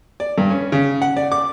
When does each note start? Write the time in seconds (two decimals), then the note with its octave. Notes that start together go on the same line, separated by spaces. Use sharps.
0.20 D5
0.38 G2
0.50 C#4
0.72 C#3
1.02 F#5
1.16 D5
1.32 D6